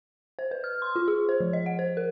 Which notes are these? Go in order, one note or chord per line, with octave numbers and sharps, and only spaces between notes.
C5
B4
F6
C6
F4
G#4
C5
F3
D#5
F#5
C5
A#4